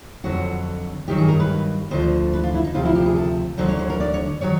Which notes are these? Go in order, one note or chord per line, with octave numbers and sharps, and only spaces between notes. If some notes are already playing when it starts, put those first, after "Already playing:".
F2 D3 F#3 F#4
G2 D#3 F#3 G4
G#4
A#4
B4
D2 D3 F3 C5
B4
F4
E4
D#4
D2 C3 F3 F4
E4
G4
G#4
A4
D2 D3 F#3 C5
C#5
C5
A#4
D5
C#5
D#3 F#3 C#5